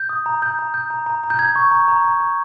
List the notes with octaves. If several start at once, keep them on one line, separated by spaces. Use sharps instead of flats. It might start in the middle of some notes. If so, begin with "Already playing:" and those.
Already playing: G6
D#6
A#5
A#5 G6
A#5
G6
A#5
A#5
A#5
G6
A#5 G#6
C#6
A#5
A#5
A#5
A#5